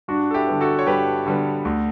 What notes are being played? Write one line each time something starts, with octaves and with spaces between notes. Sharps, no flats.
G2 D4 F#4
A4
E4 G4
D3 G3 B3
F#4 A4
C#5
G2 G4 B4
D3 G3 B3
D2